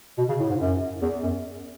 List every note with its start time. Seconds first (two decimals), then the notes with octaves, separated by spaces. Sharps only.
0.18 B2
0.29 C#3
0.40 A2
0.49 G#2
0.60 F#2
1.02 E2
1.23 F#2